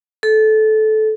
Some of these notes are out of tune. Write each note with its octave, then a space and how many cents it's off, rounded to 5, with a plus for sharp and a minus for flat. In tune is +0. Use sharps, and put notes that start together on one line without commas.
A4 -20